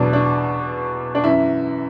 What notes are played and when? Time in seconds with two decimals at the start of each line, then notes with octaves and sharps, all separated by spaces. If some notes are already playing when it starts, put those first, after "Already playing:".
Already playing: E2 B2 F#3 D4
0.13 D4
1.15 D4
1.24 F#2 E3 E4